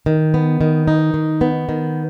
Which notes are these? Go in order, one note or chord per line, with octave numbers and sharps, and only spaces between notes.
D#3
B3
D#3
D#4
D#3
B3
D#3